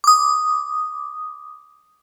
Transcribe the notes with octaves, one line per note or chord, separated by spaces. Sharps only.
D6 D#6